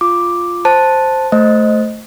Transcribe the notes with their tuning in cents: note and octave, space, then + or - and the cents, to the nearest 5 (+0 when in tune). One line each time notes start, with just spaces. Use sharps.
F4 +0 D6 +0
C5 +0 A5 +0
A3 +0 C5 +0 D#5 +0